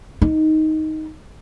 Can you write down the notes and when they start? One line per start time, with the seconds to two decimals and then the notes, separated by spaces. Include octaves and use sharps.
0.22 D#4